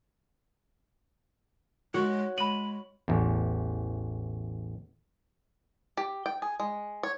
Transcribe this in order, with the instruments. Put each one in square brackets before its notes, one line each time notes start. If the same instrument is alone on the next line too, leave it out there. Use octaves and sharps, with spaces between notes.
[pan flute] G#3 [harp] F#4 [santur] C#5
[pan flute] G#3 [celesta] B5 F#7 [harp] D#7
[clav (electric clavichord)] A1 E2
[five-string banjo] G4
G5
G#4
G#3
C#5